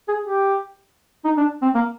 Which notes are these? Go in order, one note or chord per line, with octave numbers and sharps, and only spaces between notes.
G#4
G4
D#4
D4
C4
A#3